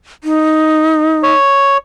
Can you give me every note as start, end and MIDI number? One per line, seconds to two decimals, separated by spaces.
0.24 1.33 63
1.23 1.77 73